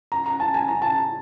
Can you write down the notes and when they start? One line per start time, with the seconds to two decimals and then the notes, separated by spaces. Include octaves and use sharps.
0.12 A#5
0.26 A#5
0.40 A5
0.54 G#5
0.68 A#5
0.82 A5